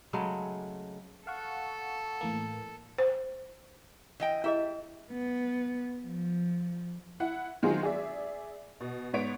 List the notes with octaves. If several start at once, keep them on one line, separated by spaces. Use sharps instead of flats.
C#3 F#3 G#3 A3
A4 F5 F#5 C#6
A2 E3 A#3
C5
E3 D#5 G5
E4 G4 G#4 D#5 E5
B3
F3
E4 F#5
D#3 F#3 G#3 C4 F4 G#4
G#4 D5 E5
B2
G#2 B3 C#5 B6 D7